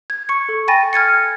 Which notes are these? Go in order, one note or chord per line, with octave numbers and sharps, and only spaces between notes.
G#6
C#6 C#7
A4
G5 G#5 B5 A6 A#6 D#7
F6 G#6 A6 C#7